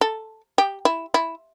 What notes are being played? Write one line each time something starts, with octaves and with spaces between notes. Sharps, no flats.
A4
G4
E4
E4